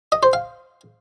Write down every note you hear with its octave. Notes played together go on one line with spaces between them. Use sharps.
D#5
C5
F5